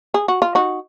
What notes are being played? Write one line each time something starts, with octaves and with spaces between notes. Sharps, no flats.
G#4
F#4
F4
D#4 F#4